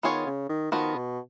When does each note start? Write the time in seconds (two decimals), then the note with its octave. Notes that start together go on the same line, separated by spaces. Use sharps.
0.03 D#3 B3 F4 G#4 C#5
0.26 C#3
0.49 D#3
0.71 D#3 F3 B3 F#4
0.95 B2